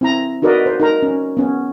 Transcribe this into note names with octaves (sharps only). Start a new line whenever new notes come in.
C4 E4 A#5
D#4 F#4 A#4 B4 D5 D#5
C5
D#4 A#4 A#5
C#4
B3 C#4